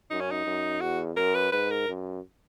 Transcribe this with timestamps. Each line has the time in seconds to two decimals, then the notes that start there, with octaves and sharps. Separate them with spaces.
0.10 F#2 D#4
0.21 C#4
0.31 D#4
0.46 F#2
0.81 E2 F#4
1.17 F#2 A#4
1.35 B4
1.52 G#2 B4
1.70 A#4
1.88 F#2